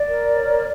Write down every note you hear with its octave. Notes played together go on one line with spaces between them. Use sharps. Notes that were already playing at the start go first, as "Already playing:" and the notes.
Already playing: D5
A#4
C#5